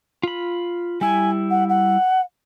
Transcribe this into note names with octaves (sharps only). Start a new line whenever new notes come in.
F4 B5
G3 E4 G#5
F#5
F#5